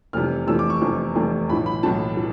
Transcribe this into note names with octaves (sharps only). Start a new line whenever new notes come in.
F1 E2 C3 E3 F6
F1 E2 C3 E3 E6
D6
C#6
F1 E2 C3 E3
F1 E2 C3 E3
B1 A2 E3 B5
B5
B1 A2 E3 A5
E3